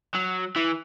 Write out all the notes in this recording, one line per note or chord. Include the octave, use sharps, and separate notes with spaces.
F#3
E3